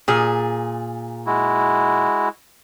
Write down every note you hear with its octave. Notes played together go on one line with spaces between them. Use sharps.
A#2 G#4
G#3 E4 F#4